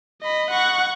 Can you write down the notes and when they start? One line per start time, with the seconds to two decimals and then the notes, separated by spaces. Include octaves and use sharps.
0.22 D#5 B5
0.51 F#5 C#6